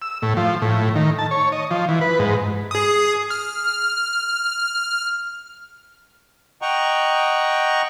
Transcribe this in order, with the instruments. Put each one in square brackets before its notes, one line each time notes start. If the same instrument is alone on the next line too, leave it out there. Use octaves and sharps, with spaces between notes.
[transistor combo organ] E6
A2
F3
A2
D#3
A5
C#5
D#5
F3
E3
B4
G#2
[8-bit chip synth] G#4 D#6
F6
[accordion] D#5 F#5 G5 A#5 C#6